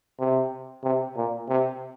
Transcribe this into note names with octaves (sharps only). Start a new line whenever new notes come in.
C3
C3
A#2
C3